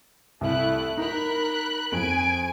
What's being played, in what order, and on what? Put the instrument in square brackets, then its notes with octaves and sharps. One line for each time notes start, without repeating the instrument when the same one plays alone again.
[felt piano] C2 [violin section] A3 E4 F#6
[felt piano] D#4 [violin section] A#4 B5 F#6
[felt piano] F2 [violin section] G#5 D7